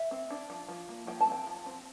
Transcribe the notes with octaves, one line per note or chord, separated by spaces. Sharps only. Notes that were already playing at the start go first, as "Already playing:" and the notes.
Already playing: E5
C4
D4
F3
F3
A#3
F3 G5
A5
C4 G5
F3
C4